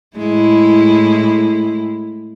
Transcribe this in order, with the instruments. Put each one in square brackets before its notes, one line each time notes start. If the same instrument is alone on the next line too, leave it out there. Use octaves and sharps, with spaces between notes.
[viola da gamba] A2 G#3 E4